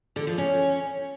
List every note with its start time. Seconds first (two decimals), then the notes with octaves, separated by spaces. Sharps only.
0.16 D3
0.27 F3
0.38 C#4